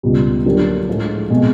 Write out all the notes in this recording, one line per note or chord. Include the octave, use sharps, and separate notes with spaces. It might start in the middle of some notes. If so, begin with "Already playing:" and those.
C#2 B2 G3
D3 F#3 A#3 D4 G4
A2 F3 G#3
B2 G#3 C4